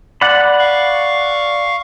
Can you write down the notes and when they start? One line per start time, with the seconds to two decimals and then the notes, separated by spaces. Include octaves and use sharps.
0.21 D5 F#5 B5
0.59 F5 C#6